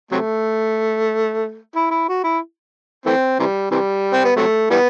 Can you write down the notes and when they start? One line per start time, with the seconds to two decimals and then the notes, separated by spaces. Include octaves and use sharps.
0.11 C3 F#3 A3
1.76 E4
1.91 E4
2.09 F#4
2.24 E4
3.06 E3 A3 C4
3.40 C3 E3 G3
3.71 C3 E3 G3
4.13 C4
4.25 B3
4.37 C3 F#3 A3
4.71 E3 G3 B3